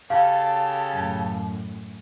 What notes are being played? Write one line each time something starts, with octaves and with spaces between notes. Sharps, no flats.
C#3 G4 A4 F5 A5
F#2 A2